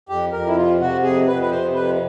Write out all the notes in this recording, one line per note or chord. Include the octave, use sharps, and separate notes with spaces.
F2 G4
F2 A#4
E4
C3 F4
C3 F#4
F2 G#4
F2 B4
B4
C3 C5
F2 B4